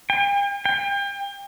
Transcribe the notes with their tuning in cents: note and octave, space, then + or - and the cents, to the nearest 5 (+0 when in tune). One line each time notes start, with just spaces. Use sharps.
G5 +45
G5 +35